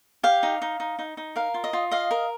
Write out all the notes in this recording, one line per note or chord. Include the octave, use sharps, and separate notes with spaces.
G4 F5
D#4
D#4
D#4
D#4
D#4
A#4 F5
F4
D#5
F4
D#5 F5
A#4